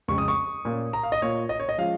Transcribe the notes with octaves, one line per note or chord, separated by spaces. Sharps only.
F2 C#3 G#3 C#6
D#6
C#6
A#2 A#3 C#4
A#5
F5
D#5
A#2 A#3 F4 C#5
D#5
C#5
D#5
F3 G#3 C#4 F4 F5